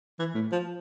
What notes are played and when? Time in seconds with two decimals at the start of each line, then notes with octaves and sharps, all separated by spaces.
0.19 E3
0.35 A2
0.52 F3